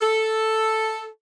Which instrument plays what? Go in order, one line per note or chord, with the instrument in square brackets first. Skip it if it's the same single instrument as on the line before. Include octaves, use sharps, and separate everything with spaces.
[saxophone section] A4